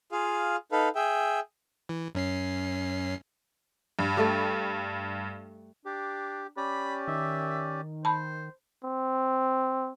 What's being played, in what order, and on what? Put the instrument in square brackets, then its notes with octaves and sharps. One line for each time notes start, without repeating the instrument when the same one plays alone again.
[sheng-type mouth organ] F4 G#4 F5
D#4 A4 B4 F5
G#4 E5 G5
[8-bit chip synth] E3
F#2 C#4 C7
[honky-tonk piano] G2
[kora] G3 A3 A4
[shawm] D4 [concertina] G4
[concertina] C#4 G4 D5 [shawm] B5
[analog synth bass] D#3 [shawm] E5
[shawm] C5 [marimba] A5 B5
[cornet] C4